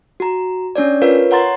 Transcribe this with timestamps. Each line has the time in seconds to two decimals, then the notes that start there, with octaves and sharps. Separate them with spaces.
0.20 F#4 A#5
0.76 C#4 D4 C#5 D5
1.02 F4 A#4 B4 C#5 F5
1.31 C#5 F#5 A#5 C6 A6